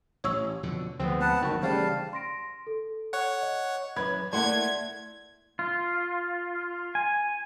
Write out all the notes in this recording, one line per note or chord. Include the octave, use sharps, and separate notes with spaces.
A1 C#5 C#6 E6
F2 B2 D3
D2 F3 G#3 B3 C4
B4 F#5 A5
F#1 D#3 F#4
C#3 E3 G3 A3 C5 F5 A5
C6 A#6 D7
A4
C#5 F#5
D#5
F#2 E3 B3 B5 G#6
A3 A#3 E4 D5 E5 F#5 C6 G#6
F4
G#5